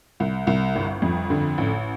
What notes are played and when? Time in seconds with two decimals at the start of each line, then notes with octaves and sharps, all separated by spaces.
0.20 C2
0.47 C2
0.76 G1
1.02 F2
1.30 D3
1.58 A1